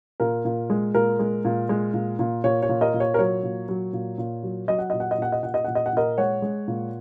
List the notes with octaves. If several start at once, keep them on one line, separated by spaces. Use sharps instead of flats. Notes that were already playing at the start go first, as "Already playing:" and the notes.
A#2 A#4
A#2
G#3
A#2 A#4
G#3
A#2
G#3
A#2
A#2
A#2 C#5
C#5
A#2
A#4 D#5
A#2
C#5
A#4
F#3 C#5
A#2
F#3
A#2
A#2
F#3
F#3 D#5
F#5
A#2 D#5
F#5
D#5
A#2 F#5
D#5
A#2 F#5
D#5
A#2 F#5
D#5
F#5
A#2 A#4 D#5
G#3 C#5 F#5
G#3
A#2